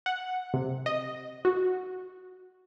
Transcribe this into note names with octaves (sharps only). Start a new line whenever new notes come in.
F#5
C3
D#5
F#4